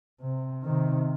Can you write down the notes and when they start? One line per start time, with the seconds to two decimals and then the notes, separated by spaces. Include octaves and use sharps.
0.21 C3
0.63 C3 D#3